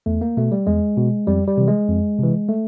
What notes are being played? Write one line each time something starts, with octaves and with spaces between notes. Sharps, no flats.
E2 A3
A#3
B2 A3
G3
E2 G#3
B2
F2 G3
G3
C3 E3
G#3
F2
C3 E3
A3